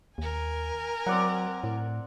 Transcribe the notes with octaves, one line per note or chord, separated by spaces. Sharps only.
D#2 A#4 G#5
F#3 C4 D5 F#5
A2